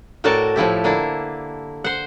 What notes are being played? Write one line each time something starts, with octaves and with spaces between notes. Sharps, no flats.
A2 F#4 A4 A#4 D5 A5
A2 F3 E4 G4
D3 A#3 D4 E4
C5 F#5